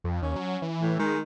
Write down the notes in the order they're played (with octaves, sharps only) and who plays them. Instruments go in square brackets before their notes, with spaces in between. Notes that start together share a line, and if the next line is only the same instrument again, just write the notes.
[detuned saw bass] F2
[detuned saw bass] D#2 [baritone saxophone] C#4
[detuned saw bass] F#3
E3
[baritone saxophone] A2
[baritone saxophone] D#3 [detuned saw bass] G#3